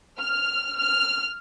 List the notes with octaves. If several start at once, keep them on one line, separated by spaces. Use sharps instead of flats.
F6
F6